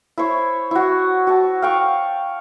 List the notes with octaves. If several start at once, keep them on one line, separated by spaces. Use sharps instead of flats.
E4 C5 C#5
E4 F#4
F#4 A5
F5 G5 C#6